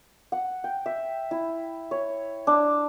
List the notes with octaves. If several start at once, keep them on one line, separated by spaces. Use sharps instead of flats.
F#5
G5
E5
E4
C#5
D4